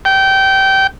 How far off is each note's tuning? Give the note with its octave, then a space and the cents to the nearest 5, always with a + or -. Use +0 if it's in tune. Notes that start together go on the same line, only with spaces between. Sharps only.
G5 -20